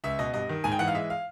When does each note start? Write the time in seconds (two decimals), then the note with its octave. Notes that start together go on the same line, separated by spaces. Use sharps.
0.04 C#2 E5
0.19 B2 D#5
0.34 G2 D#5
0.49 D#3
0.64 G#2 G#5
0.72 G5
0.79 E3 F#5
0.88 F5
0.95 G#3 E5
1.10 F5